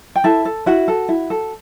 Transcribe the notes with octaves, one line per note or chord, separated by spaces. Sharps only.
G5
E4 A4 A5
A4
E4 F#4 F#5
A4
E4
A4